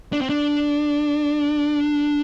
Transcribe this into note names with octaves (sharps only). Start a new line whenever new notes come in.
D4
C4
D4